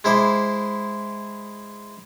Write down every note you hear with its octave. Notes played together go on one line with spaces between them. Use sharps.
G#3 E4 C5 D6